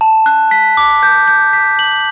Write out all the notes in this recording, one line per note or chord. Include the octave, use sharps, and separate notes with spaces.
A5
F#6
B6
D6
G6
G6
B6
F#7